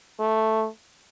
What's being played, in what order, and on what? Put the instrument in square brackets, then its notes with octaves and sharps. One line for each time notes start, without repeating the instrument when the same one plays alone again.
[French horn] A3